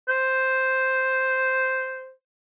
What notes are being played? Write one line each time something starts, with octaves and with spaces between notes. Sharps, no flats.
C5